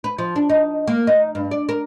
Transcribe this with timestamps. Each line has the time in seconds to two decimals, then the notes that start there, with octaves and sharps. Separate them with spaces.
0.04 B4
0.19 F3
0.36 D4
0.50 D#4
0.87 A#3
1.07 D#4
1.35 G2
1.51 D5
1.69 A#4